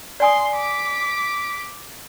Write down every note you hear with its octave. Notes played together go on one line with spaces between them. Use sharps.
D5 G#5 C6 D#6
D6 B6